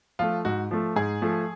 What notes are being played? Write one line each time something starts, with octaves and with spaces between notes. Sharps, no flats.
F3 A3 F4
G#2 F#4
F3 A3
G#2 G#4
F3 A3